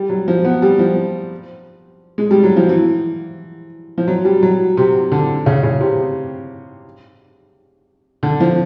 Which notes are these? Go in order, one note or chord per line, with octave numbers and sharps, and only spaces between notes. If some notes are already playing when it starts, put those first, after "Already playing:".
Already playing: G3
F#3
F3
B3
G3
F3
G#3
G3
F#3
F3
E3
F3
F#3
G3
F#3
C3
D3
C#3
C#3
C3
D3
F3